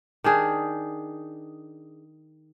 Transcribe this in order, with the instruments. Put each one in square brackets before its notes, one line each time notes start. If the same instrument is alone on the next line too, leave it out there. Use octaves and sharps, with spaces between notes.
[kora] D#3 D4 G#4